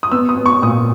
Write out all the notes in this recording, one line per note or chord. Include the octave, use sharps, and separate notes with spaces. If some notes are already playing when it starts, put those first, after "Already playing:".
D#6
B3 E6
D#6
B3
C#6
A#2 D#6